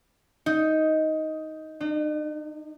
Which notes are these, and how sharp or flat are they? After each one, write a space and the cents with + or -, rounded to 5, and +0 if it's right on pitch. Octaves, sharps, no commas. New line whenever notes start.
D#4 +10
D#4 -45